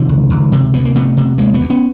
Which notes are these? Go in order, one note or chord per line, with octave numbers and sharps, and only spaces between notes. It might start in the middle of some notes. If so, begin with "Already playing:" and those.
Already playing: C3 D#3 F3
C#2
C#2
C3
D2 B3
A#3
C3 A3 B3
C3
D2 G#3 A#3
A3 B3
D2
B3 C#4